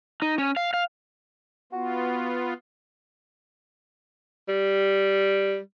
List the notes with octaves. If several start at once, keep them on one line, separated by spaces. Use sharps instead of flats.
D#4
C#4
F5
F5
B3 F4 F#4
G3